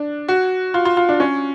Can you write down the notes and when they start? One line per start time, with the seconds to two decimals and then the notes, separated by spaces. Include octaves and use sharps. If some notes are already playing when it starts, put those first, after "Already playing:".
Already playing: D4
0.28 F#4
0.74 F4
0.85 F4
0.97 F4
1.09 D4
1.20 C#4